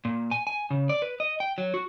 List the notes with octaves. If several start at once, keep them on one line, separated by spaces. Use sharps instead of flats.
A#2
G#5
G#5
C#3
D5
B4
D#5
G5
F#3
F#4